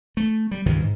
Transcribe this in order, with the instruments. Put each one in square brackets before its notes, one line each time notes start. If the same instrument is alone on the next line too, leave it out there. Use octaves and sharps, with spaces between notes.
[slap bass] A3
G3
C#2 G2 D#3 E3
G#2